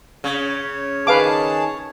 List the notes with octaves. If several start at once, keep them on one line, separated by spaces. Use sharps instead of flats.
C#3 C#5
D#3 G#4 B4 F5 A5 D6